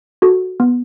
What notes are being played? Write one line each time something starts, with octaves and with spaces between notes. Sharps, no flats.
F#4 A4
B3